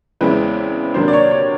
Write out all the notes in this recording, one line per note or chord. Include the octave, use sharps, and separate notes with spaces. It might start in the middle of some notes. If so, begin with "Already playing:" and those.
E2 C#3 E3 G#3 C4 B4
C3 D#3 F#3 A#3 D4 C5
D5
C#5
C#5